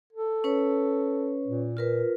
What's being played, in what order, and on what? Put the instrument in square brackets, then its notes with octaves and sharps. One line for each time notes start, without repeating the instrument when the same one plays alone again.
[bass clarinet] A4
[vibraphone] C#4 B4 C#5
[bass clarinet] A#2
[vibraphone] F4 A#4 B4